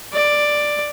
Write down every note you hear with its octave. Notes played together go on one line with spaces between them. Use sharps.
D5